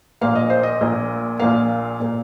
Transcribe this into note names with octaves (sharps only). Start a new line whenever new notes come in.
A#1 A#2 A#3 F5
D#5
C5
D#5
A#1 A#2 A#3
A#1 A#2 A#3 F5
A#2 A#3